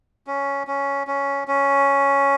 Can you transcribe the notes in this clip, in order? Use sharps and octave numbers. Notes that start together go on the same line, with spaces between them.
C#4
C#4
C#4
C#4